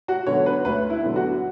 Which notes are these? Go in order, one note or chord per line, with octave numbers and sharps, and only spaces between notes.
F#4
D3 F#3 B3 C#5
B4
D2 B4
E4
D3 F#3 B3
F#4